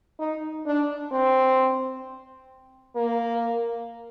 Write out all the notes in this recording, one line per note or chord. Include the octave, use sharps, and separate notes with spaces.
D#4
D4
C4
A#3